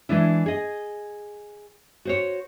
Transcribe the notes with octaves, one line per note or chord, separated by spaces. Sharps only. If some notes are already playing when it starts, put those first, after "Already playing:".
E3 G#3 D4 E4
G#4 D#5
F#4 C5 C#5